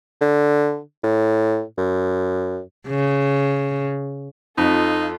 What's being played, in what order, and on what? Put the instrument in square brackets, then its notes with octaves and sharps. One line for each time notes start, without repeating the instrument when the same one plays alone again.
[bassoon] D3
A2
F#2
[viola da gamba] C#3
[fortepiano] F2 [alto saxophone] D#4 [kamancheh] F4 A4